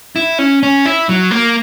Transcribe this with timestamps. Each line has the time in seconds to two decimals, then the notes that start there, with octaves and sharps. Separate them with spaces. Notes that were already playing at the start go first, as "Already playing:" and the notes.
0.16 E4
0.39 C#4
0.63 C#4
0.86 E4
1.09 F#3
1.31 A#3